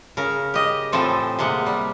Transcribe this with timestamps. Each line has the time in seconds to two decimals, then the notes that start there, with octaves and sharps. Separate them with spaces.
0.17 C#3 A#4
0.54 G4 D#5
0.92 A2 E3 F3 C4 A4
1.39 C3 G#3 A#3 F#5
1.66 G3